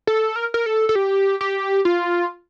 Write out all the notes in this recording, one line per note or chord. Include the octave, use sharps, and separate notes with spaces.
A4
A#4
A#4
A4
A4
G4
G4
F4